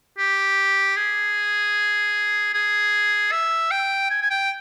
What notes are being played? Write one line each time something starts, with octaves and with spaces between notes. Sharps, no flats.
G4
G#4
G#4
E5
G5
G#5
G#5
G5